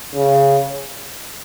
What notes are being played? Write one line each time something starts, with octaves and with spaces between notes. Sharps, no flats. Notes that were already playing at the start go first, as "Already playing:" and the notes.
C#3